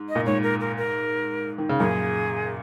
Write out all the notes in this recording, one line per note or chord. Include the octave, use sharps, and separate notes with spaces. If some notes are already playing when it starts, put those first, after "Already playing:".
Already playing: G#2
D#5
A#2
G#2 C#5
A#4
A#4
A#4
D#3
C#3
F#2 A#2 G#4